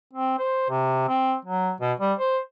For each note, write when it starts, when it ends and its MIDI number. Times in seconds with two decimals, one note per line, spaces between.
0.13 0.38 60
0.39 0.69 72
0.69 1.07 48
1.08 1.34 60
1.45 1.72 54
1.80 1.92 47
2.00 2.13 55
2.19 2.38 72